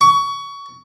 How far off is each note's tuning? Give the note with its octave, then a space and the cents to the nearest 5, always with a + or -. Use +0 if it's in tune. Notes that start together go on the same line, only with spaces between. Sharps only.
C#6 +25